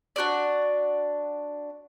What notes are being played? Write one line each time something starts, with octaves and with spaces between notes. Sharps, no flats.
D4 F#4 A#4 D5